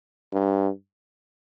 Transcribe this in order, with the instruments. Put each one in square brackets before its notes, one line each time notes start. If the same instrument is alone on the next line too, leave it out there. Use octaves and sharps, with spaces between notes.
[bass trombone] G2